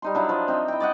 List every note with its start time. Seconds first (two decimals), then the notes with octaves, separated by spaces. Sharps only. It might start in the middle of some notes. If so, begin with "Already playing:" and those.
0.02 G3 D#4 C6
0.15 F#3 D4 E4
0.29 F3
0.48 C4 D#4
0.68 E4 G5
0.80 D5 D#5 F#5